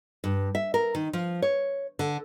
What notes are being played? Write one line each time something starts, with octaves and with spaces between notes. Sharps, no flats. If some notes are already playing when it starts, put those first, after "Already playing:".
G2
E5
A#4
D#3
F3
C#5
D3